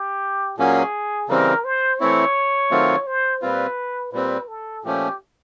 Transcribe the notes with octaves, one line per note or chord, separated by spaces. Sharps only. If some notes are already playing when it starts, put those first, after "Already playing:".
Already playing: G4
A#2 F#3 A#3 C#4 G#4
C#3 E3 G3 C4 A#4
C5
E3 A3 C4 E4 C#5
D#3 F#3 A3 C4 F4
C5
A#2 G3 C4 F4 B4
A#2 G3 C4 B4
A4
A#2 F3 A3 C#4 G4